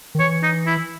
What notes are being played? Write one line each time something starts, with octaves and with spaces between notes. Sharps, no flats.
D#3
E3 C#5
D#4
E4